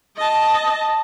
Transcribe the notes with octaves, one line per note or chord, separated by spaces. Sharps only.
D#5 A5